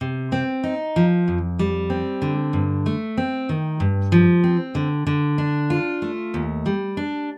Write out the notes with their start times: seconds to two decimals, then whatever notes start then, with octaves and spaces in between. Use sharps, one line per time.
0.01 C3
0.32 C4
0.64 D#4
0.96 F3
1.28 F2
1.59 G3
1.90 C4
2.22 D3
2.53 G2
2.86 A3
3.17 C4
3.49 D#3
3.80 G2
4.12 F3
4.44 C4
4.75 D3
5.07 D3
5.38 D4
5.70 F4
6.02 A3
6.34 D#2
6.66 G3
6.97 D4